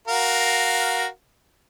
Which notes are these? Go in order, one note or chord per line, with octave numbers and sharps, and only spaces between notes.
F#4 A#4 F5